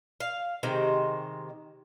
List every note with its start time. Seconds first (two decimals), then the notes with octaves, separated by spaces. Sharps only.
0.20 F5
0.63 C3 D#3 G#3 C5